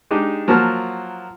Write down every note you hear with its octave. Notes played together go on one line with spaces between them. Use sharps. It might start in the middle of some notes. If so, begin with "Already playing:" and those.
G#3 D4 D#4 G4
F3 F#3 A#3 F#4 A5 F6